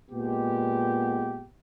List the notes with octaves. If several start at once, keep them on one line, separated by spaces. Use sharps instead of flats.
A#2 G#3 B3 G4